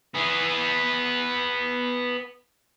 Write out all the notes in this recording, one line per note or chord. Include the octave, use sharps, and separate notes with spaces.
B3 G#4